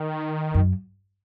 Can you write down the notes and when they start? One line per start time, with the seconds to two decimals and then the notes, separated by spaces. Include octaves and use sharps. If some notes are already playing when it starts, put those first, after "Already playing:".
Already playing: D#3
0.54 F#2